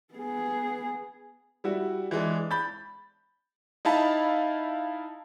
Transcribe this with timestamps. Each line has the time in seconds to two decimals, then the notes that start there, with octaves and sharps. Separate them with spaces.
0.14 B3 G#4
1.64 G3 E4 F#4
2.11 E3 G#3 D4
2.51 B5 G6 A6
3.85 D#4 E4 F5 A5 B5